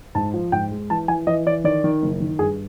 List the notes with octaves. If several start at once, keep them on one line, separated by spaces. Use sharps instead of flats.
G#2 A5
F3
G#2 G5
G#3
E3 A5
E3 G#5
E3 D#5
E3 D5
D#3 D5
D#3
F#1
D#3
G2 G#4